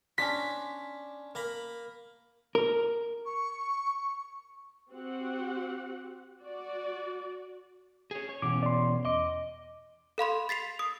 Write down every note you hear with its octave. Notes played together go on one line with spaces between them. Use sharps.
C#4 D4 C6 B6
A#3 A#5 B5
A#4
C#6
C4 F#4 G4 F#5
F#4 D5
G#4 C#5
C#5
B2 E3 C#4 D6
D5 C6
E2 D#5 D6
A4 F5 B5 C6
A6 B6 C7 F7
D#6